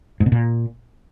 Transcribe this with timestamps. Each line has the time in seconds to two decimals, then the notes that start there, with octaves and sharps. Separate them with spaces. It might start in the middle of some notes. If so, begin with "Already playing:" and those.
0.20 G#2
0.26 B2
0.32 A#2